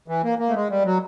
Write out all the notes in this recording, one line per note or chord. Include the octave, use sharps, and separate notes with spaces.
E3
A#3
A#3
A3
G#3
G3
F#3